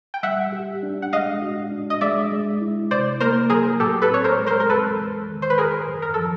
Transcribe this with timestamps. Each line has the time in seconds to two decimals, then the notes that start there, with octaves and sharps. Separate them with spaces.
0.14 G5
0.23 G3 E5 F#5
0.52 G4
0.83 D4
1.02 F#5
1.13 G#3 D#5 F5
1.42 F#4
1.72 D4
1.90 D#5
2.01 G#3 D5 E5
2.32 G#3
2.60 E4
2.91 C3 C5 D5
3.20 A#3 A#4 C5
3.50 F#3 G#4 A#4
3.80 A2 G4 A4
4.02 A4 B4
4.10 C4 C#5
4.24 A#4 C5
4.40 G#3
4.46 A#4 C5
4.60 A#4
4.69 E2 A4 B4
4.99 E2
5.28 D#3
5.42 C5
5.50 B4
5.58 F#2 G#4 A#4
5.88 F#2
6.02 A#4
6.14 F3 A4